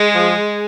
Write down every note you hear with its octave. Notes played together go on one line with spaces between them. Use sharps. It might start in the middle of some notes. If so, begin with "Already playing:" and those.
Already playing: G#3
F3